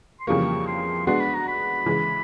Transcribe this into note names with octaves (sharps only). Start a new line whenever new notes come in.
C6
F2 C#3 E3 G3 A#3 C#6
C6
G#3 B3 D4 F#4 C6
B5
A#5
B5
C#3 E3 G#3